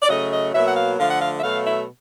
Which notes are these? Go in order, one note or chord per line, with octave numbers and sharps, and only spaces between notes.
D5
C#3 F#3 A3 D#5
D#5
B2 F#3 A#3 E5
F#5
F5
D3 F3 A3 F5
F#5
F5
E5
B2 F#3 A3 F5
E5